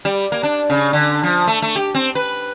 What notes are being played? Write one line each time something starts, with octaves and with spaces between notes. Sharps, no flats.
G3
A#3
D4
C#3
D3
F3
A3
A3
G4
C4
B4